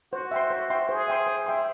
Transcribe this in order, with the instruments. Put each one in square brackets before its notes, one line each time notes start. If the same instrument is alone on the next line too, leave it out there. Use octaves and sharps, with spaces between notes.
[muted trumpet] F#4 [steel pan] C5
[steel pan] E5 G5 C6
C5
E5 G5 C6
[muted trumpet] G#4 [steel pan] C5
[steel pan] E5 G5 C6
C5
E5 G5 C6